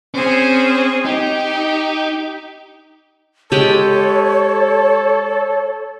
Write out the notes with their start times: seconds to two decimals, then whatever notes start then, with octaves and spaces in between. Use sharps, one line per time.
0.14 C4 C#4 G#4
1.05 D#4 G4
3.52 G#3 G4 A4 C#5